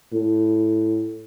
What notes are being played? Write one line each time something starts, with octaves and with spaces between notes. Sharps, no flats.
A2